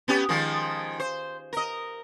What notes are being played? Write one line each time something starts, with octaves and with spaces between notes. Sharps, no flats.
B3 C#4 G4
D#3 F3 G#3
C5
A#4 D#5